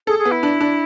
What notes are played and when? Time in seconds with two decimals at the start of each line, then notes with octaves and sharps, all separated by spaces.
0.07 G#4 A4
0.18 G#4
0.25 B3
0.31 E4
0.43 D4
0.61 D4